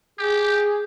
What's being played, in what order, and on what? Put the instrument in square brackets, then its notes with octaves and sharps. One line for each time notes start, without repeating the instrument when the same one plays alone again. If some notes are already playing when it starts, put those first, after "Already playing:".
[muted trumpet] G4 [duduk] G#4